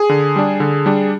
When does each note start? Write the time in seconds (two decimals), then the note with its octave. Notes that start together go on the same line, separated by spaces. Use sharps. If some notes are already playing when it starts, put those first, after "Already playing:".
Already playing: G#4
0.09 D3
0.36 G3 D4
0.60 D3
0.86 G3 D4